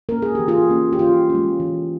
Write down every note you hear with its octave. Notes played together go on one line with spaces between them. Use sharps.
A#3 C#4 A#4
G#4
E3 G4
F4 G#4
A#3 C#4
G4
E3 F4
G#3 C#4
E3